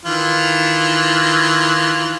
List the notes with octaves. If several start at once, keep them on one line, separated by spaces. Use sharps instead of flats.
D#3 E3 F4